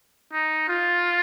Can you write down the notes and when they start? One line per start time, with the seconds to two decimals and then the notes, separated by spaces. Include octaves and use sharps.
0.32 D#4
0.68 F4